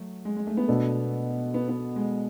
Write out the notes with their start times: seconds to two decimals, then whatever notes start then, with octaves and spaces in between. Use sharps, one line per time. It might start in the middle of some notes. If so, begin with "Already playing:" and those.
Already playing: F#3 A3
0.25 G#3
0.37 G#3
0.47 A3
0.57 B3
0.68 B2 A3 D4 A4
1.54 B3
1.69 B3
1.96 G#3